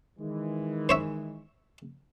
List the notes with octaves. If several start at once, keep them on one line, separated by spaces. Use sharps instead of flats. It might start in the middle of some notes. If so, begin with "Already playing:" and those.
D#3 E3 G#3
C5 C#5 E5